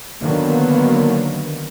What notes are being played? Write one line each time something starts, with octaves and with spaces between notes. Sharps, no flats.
D3 D#3 F#3 A#3 B3